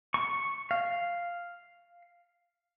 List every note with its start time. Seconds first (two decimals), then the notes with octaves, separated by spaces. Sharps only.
0.14 C#6
0.71 F5